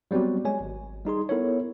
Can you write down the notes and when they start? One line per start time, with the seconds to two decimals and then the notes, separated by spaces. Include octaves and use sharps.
0.11 F#3 G3 B3 C4 F#4
0.45 G#3 C#5 G#5
0.60 G#1
1.05 G3 D#4 G#4 C6
1.29 B3 E4 A4 A#4 C#5